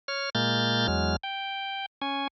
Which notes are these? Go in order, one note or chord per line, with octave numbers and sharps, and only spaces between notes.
C#5 F6
A#2 G#3 A#3 F6 G6 A6
E2 F#3 G#3 F6
G5
C#4 G#5